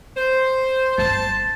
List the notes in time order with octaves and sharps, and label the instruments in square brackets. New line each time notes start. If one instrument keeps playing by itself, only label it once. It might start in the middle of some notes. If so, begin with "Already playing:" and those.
[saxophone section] C5
[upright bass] G1 [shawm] A5